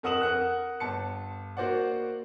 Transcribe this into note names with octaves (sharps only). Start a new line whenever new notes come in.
F2 A#4 F#5 D#6 E7 F#7
A#4 F#5 F#6
G1 A5 C#7
A#3 F#4 C5 D5 F#5